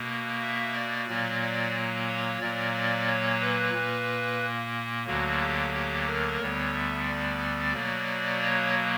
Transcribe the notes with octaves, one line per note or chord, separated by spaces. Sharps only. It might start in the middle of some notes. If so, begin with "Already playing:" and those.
Already playing: B2 A#3
E5
D5
A#2 F#3 A#3 D5
D5
C#5
A#2 F#3 A#3 D5
D5
C#5
B4
A#2 A#3
D2 D3 F#3 A#3 F#4
G4
G4
A#4
D2 D3 G3 B3 C#5
E5
D5
B2 F#3 A#3
C#5